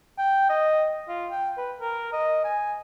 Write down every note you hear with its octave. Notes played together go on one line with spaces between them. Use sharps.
G5
D#5
F4
G5
B4
A#4
D#5
G#5